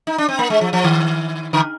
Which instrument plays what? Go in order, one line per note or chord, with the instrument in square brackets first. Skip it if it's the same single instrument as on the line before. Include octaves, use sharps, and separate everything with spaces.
[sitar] D#4
D4
C4
A#3
G#3
F3
F3
D#3
D3